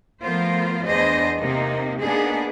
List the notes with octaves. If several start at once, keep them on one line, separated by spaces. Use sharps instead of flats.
F3 A3 B3 F4 A#4 C5
E2 B3 D4 G#4 C5 D#5
C3 A#3 D#4
A#3 B3 D4 D#4 G#4